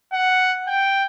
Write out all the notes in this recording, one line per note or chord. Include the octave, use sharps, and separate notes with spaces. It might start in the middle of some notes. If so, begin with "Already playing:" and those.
F#5
G5